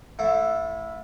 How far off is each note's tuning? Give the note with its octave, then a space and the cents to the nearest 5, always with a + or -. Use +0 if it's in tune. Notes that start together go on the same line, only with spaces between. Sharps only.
A3 +0 E4 +0 F5 +45